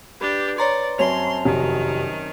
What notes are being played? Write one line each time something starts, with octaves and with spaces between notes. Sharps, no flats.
D4 G4 B4 G6
C#5 D5 A#5 C6
F#2 C4 C#5 A5 C6 F7
F1 D#3 F#4